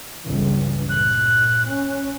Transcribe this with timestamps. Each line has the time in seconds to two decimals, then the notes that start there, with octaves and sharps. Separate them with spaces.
0.24 G1 C#2 E3
0.89 A#2 F#6
1.66 C#4